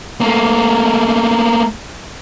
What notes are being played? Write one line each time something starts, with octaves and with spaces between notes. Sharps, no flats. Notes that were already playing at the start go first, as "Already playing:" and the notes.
A3 A#3